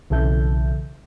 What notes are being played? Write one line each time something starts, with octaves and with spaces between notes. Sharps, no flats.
B1 C#3 E3 A4 E5 G6